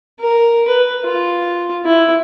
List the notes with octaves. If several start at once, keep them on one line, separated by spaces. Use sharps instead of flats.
A#4
B4
F4
E4